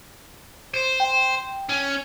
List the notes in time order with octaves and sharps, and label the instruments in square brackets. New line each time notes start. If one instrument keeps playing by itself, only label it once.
[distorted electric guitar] C5
[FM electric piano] G5
[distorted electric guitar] C#4